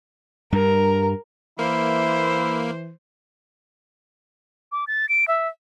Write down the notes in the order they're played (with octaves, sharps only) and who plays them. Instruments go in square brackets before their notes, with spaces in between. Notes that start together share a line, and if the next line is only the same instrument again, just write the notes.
[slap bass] G2 G3 [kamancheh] A#4
[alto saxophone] E3 [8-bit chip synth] A#3 [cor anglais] E4 [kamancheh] C5
[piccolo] D6
A6
D7
E5